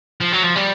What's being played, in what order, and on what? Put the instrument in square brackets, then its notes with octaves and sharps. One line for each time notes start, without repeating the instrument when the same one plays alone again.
[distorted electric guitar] F3
F#3
F3
G3